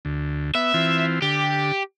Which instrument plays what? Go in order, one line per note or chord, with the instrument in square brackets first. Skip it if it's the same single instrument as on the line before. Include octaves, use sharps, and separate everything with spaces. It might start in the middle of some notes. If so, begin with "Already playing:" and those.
[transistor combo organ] D2
[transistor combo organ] B3 [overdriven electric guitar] E5
[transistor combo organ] E3 C4 F4
[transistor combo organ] D3 [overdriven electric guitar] G4